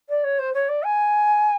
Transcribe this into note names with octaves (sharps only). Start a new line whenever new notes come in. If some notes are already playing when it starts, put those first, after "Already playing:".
D5
C#5
C5
C#5
D5
G#5